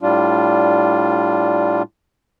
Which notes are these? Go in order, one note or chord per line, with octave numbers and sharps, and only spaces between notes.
A2 G3 D4 F4